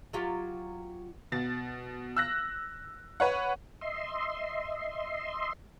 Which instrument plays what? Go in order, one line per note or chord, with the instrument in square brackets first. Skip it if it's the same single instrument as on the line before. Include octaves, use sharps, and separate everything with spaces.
[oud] F#3 F4 G4
[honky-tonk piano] B2 A6
E6 F#6 A#6
B4 C#5 F#5
[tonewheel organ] D#5 E5 C6